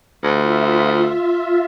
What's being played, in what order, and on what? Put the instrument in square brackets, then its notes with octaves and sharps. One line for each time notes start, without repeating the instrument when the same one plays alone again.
[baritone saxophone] D2 [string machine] F4 E5